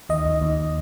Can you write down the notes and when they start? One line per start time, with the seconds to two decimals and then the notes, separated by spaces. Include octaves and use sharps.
0.09 D#2 D#5
0.25 D#2
0.41 D#2